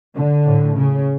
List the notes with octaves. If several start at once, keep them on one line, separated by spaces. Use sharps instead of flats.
D3
A2
C#3